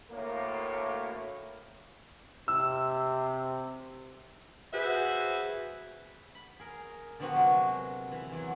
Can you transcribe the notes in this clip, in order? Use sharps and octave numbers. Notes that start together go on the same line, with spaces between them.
D2 A2 A#3
C3 E6
F#4 G#4 B4 C5 E5
B5
G#4 A#4
D3 F3 B3 C4 F#4
C3 F#3 G#3 A#3
E3 E4
E2 F#3